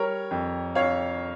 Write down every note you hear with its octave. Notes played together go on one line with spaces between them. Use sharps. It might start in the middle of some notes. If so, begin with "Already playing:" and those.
Already playing: G3 A#4 C#5
F2
F2 C#5 F5